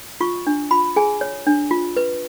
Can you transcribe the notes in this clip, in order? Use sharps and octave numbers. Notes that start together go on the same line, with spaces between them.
F4 C#6
D4
F4 B5
G#4 G#5
C#5
D4
F4
B4